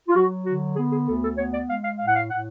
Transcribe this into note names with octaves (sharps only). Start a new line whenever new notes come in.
F4
F#3 F#4
D3 F#4
B3 G#4
G#4
D2 A4
A4
B3 C#5
D5
G#3 F5
F5
A2 F5
F#5
F5
A2 F#5